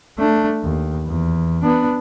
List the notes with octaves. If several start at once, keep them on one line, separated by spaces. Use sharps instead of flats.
A3 D4
D#2
E2
B3 D4